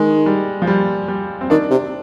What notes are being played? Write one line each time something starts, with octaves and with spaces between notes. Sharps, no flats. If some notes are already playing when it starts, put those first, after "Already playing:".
Already playing: D#3 G#3
G3
F3
G3
G3
C4
D#3 D4
C3